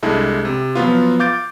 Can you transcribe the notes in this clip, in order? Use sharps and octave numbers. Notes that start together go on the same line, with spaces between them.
C2 G#3 D4 E4 A4
C3
F3 F#3 B3 F4
F5 D6 G6 A6 D7